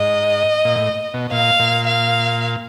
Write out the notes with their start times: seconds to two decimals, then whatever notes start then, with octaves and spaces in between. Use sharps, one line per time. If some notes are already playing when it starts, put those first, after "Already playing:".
Already playing: G#2 D#5
0.65 A#2
0.76 A2
1.14 B2
1.32 A#2 F5
1.59 A#2
1.87 F5